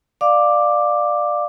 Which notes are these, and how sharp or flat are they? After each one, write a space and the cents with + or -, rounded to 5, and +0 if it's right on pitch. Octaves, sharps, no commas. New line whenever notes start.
D5 +15 F5 +10 D6 +5